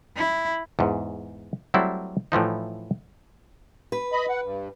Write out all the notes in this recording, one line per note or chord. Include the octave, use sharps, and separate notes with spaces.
E4
E2 G#2
F#3 G3 A3 C4 E4
A2 E3 F3 D#4
B4
D#5 B5
F#5
G2